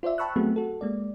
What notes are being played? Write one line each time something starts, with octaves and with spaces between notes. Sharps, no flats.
F4 C5 D5 E5
G5 A5 B5 C#6 E6 F#6
F#3 A3 B3 C4 F#4 G#4
F#4 A4
G#3 A#3 D5